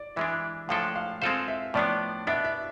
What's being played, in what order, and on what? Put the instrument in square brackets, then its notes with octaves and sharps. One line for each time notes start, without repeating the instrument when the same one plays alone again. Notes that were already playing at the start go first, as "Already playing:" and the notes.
Already playing: [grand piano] D5
[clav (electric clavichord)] E3 G#3 D4 [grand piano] E5
[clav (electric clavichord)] A2 F3 G#3 D4 A4 [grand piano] F5
[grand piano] F5
[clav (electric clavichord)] G#3 C4 F4 A4 C5 [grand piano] F5
[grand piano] E5
[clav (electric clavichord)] A2 F3 B3 D4 [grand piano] D5
[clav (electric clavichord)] B2 B3 D4 [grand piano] E5
[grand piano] E5